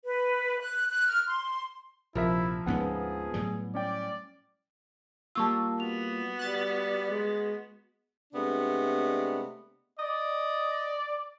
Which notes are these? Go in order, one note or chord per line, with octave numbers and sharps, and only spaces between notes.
B4
F#6
F#6
F6
C6
A#1 C3 F3 E4 A#4 E5
D2 G#2 B3 C#4 G#4
A2 F#3 G3
C#4 D5 G5
G3 A#3 F4 A5 C#6 E6
B3 F#4 F7
G3 F#6 A6
G#3
C3 G#3 A3 B3 D4
D5 D#5